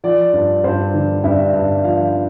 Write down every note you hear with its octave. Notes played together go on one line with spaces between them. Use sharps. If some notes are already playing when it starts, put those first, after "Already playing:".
F3 D5
G2
G2 C5
D3
G2 E5
G2
F3 F5